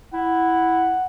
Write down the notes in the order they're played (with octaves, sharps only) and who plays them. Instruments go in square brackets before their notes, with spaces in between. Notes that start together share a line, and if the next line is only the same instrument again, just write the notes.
[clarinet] E4 [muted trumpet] F#5